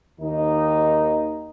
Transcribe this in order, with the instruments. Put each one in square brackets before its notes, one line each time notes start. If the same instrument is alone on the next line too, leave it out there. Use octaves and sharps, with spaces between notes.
[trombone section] D#2 D#3 D#4